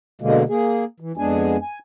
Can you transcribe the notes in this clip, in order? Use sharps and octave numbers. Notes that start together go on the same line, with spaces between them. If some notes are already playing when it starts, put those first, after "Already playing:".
B2 D3 G#3 A#3
A#3 G#4
E3
F2 G#3 B3 D4 G#4 G#5
G#5